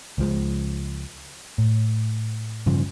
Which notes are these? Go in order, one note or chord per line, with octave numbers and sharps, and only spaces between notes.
C#2 F3 G#3
A2
G2 C#3 F3